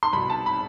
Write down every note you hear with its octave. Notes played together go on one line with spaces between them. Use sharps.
C6
C2 B2 B5
A5
B5